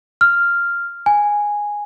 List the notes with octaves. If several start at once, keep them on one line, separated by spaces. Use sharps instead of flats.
F6
G#5